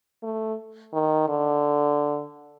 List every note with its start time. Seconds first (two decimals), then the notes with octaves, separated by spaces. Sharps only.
0.23 A3
0.93 D#3
1.28 D3